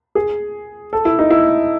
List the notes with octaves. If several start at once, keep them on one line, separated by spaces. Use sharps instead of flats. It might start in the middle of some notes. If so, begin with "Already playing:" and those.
G#4
A4
E4
D#4
E4